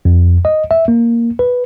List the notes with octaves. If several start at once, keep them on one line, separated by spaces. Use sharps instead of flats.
F2
D#5
E5
A#3
B4